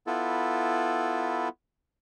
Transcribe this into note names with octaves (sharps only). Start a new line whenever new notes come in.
B3 E4 F4 A4